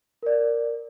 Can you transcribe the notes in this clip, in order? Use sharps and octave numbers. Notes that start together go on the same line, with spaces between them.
A#4 D5